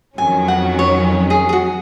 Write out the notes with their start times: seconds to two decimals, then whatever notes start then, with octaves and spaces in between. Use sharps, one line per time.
0.18 F2 D#3 F#3 C#4 G#5
0.48 F#5
0.79 C#5
1.30 G#4
1.49 G#4
1.53 F#4